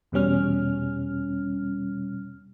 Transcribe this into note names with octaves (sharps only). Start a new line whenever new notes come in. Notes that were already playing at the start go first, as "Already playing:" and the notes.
E2 B2 G3 C#4 F6